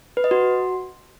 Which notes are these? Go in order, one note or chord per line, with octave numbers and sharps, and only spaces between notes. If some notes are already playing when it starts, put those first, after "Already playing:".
B4
D#5
F#4